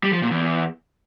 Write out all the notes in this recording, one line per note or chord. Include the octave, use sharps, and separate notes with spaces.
G3
F3
A#2
E2